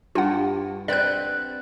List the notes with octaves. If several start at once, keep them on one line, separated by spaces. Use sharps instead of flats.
G2 F4 F#5
C4 B4 D5 F#5 F#6